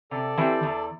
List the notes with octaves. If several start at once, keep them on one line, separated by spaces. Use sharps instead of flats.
C3 A4 D5
E3 C4 G4
E2